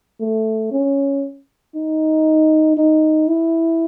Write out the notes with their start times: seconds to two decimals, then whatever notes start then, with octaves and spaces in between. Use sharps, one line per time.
0.20 A3
0.72 C#4
1.75 D#4
2.77 D#4
3.28 E4